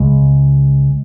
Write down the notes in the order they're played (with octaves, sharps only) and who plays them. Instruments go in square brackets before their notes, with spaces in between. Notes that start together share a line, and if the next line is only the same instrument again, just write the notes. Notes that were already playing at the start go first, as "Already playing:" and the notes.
Already playing: [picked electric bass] C#2 C#3 G#3